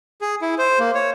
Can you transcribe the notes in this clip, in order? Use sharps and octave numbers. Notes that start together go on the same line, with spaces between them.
G#4
E4
C5
A#3
C#5